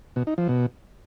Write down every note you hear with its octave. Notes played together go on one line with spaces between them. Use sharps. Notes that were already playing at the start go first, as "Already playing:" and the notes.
B2
D#4
F3
B2